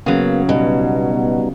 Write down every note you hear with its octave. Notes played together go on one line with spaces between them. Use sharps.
C#3 F#3 A#3 B3
B2 G3 B3 D#4